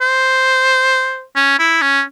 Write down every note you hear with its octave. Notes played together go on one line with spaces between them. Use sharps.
C5
C#4
E4
C#4